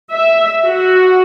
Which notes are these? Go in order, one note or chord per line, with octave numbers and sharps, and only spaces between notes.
E5
F#4